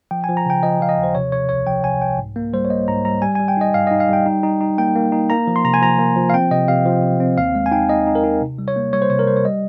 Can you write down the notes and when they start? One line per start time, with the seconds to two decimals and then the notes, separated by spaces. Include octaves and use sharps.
0.11 F3 G5
0.24 G#5
0.29 F3
0.37 A#5
0.46 C#3 G5
0.63 F3 D#5
0.80 F3 F5
0.89 D#5
0.98 D#2
1.03 C5
1.15 C3 C#5
1.32 C3 C#5
1.49 C2 C#5
1.67 F3 G5
1.84 C3 G#5
2.01 C2 G5
2.19 G#2
2.36 A#3
2.53 G3 C5
2.65 C#5
2.70 A#3 D#5
2.88 G#2 A#5
3.05 G3 A#5
3.22 G3 G#5
3.35 G#5
3.40 G3
3.48 G5
3.57 D#4 D#5
3.74 G2 F5
3.87 D#5
3.91 D#4
4.00 F5
4.09 G3 G5
4.26 D#4
4.43 D#4
4.61 D#4
4.78 A#3 G5
4.96 A#3
5.12 D#4
5.30 A#3 A#5
5.47 F3
5.56 C6
5.65 C3 A#5
5.74 G#5
5.81 F3 A#5
5.99 A#3
6.16 F3
6.30 F5
6.34 C4 G5
6.51 C3 D#5
6.68 C3 F5
6.85 F3
7.03 C3
7.20 C4
7.38 D#2 F5
7.55 G#3
7.66 G#5
7.71 D#4 G5
7.89 D#4 D#5
8.07 D#4
8.15 A#4
8.24 D#4
8.41 C3
8.58 G3
8.68 C#5
8.76 A#3
8.93 G3 C#5
9.02 C5
9.10 C3 C#5
9.19 A#4
9.27 G3 C5
9.36 C#5
9.45 G3 D#5